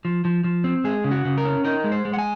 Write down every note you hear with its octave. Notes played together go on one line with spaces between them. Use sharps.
F3
F3
F3
C4
G#3 G#4
C#3
F#4
C#3
A#4
C#4
D#4 A#4
G#3
C5
G#3
F#5
G#5